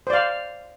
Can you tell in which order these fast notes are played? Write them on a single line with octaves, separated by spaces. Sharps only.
C5 D5 F5